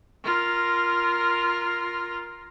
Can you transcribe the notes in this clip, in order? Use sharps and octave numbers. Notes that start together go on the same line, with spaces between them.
F4 A#4